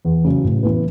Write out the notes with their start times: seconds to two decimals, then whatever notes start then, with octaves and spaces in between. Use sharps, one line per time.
0.05 E2
0.24 C#3 F#3
0.44 A2
0.63 E3 B3 E4 B4